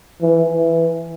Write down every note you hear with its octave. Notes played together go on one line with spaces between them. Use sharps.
E3
E3